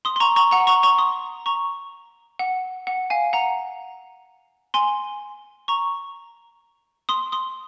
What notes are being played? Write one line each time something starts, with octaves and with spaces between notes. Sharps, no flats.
C6 D#6
C6
A#5 C#6
A#5 C#6
F#5 A#5
A#5 C#6
A#5 C#6
C6 D#6
A#5 C#6
F#5
F#5
F5 G#5
F#5 A#5
G#5 C6
A#5 C#6
C6 D#6
C6 D#6